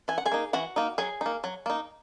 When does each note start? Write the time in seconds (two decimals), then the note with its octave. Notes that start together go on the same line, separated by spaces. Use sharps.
0.08 E3 G#5
0.18 F#5
0.26 G#4 G#5
0.32 A#3 D#4
0.53 E3 F#4 F#5
0.76 A#3 D#4
0.98 F#3 G#4 G#5
1.21 A#3 D#4
1.44 F#3
1.66 A#3 D#4